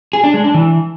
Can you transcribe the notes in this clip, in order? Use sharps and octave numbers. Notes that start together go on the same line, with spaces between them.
G#4
D4
G#3
D4
E3